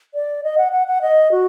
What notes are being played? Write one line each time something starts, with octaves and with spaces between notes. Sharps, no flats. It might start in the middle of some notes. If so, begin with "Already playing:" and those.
D5
D#5
F#5
F#5
F#5
D#5
F#4